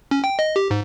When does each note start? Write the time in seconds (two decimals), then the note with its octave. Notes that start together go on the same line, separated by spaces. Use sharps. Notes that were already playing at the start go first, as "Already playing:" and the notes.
0.11 C#4
0.24 G5
0.39 D#5
0.56 G4
0.71 G#2